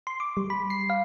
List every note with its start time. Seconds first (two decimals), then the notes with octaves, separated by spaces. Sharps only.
0.07 C6
0.20 D6
0.37 G3
0.50 B5
0.70 C7
0.90 F5